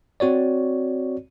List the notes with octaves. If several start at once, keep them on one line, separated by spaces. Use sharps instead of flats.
C4 F#4 C#5 D5